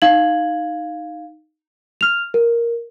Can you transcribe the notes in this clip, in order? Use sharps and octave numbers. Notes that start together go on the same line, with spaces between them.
D#4 F5 G#6 F#7
F6 F7
A#4